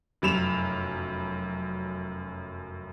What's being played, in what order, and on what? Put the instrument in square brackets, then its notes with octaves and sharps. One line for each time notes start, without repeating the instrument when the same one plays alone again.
[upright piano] F1 F#2 B5 E7 F7